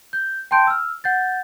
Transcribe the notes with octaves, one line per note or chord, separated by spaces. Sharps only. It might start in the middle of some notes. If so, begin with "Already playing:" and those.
G6
G5 A5 C6 G6 D7
E6 F6
F#5 G6 A6